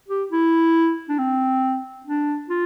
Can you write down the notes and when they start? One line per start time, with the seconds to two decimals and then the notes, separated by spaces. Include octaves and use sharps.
0.08 G4
0.31 E4
1.09 D4
1.18 C4
2.06 D4
2.49 F4